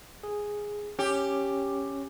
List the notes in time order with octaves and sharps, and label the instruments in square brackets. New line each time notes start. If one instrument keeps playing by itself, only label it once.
[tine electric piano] G#4
[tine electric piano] C#4 [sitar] G4